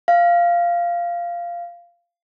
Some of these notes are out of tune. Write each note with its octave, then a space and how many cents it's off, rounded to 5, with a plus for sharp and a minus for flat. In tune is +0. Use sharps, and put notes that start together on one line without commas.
F5 -10